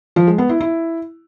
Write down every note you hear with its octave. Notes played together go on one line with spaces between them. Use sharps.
F3
G#3
B3
E4
E4